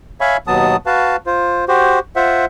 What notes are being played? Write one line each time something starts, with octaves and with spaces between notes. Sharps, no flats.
C#5 E5 F5 G#5 B5 C#6
D#2 B2 F#3 B3 A5 D#6
F#4 B4 F5 A5
F4 C5
F#4 G4 C5
F4 C5 E5 F#5